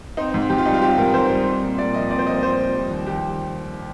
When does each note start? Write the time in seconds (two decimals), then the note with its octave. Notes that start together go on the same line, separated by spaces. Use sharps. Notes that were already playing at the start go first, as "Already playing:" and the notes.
0.17 C4 D#4
0.34 G#2
0.50 G#2 G4
0.58 F4
0.66 G3 D#4
0.74 F4
0.82 C4 G4
0.98 G#2 A#4
1.14 G#2 C5
1.30 G3
1.46 C4
1.63 A#2
1.78 A#2 D5
1.94 F3 D#5
2.11 C4 D5
2.19 C5
2.26 A#2 D#5
2.42 A#2 C5
2.59 F3
2.75 G3
2.91 D#2
3.06 D#2 G4